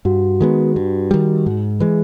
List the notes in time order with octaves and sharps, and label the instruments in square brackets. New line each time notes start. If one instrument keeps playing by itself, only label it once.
[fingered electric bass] G2 [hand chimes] F#4
[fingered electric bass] D#3 G#3 B3
G2
D#3 G3
G#2
[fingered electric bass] E3 G#3 [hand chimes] G#4